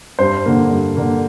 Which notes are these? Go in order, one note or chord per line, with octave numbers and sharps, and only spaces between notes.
G2 C5
D3 A#3
G2
D3 A#3